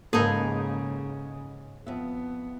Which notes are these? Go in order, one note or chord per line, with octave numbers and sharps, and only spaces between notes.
G#2 C#3 G#3 A#3 D#4 G#4 A4 B4
F2 B3 E5